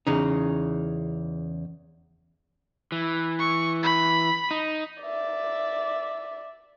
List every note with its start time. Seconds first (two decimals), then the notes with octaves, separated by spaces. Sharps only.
0.07 E2 C#3 D#4
2.92 E3
3.39 C#6
3.83 B5
4.51 D#4
5.02 D5 E5